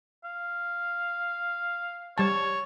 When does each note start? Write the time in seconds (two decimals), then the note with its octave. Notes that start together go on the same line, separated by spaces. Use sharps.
0.24 F5
2.18 G3 C#5 A5